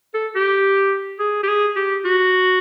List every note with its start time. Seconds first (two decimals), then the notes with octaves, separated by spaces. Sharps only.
0.14 A4
0.35 G4
1.19 G#4
1.43 G4
1.48 G#4
1.76 G4
2.05 F#4